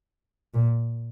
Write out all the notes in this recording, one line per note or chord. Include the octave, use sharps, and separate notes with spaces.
A#2